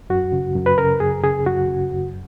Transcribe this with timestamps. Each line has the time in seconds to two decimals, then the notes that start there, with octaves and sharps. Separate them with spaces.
0.10 F#2 F#4
0.32 C#3
0.56 F#2
0.66 B4
0.78 C#3 A#4
1.00 F#2 G#4
1.23 C#3 G#4
1.46 F#2 F#4
1.68 C#3
1.91 F#2